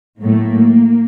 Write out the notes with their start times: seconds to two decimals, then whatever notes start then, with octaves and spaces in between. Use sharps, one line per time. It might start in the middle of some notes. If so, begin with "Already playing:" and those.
0.19 A2 F#3 A3 A#3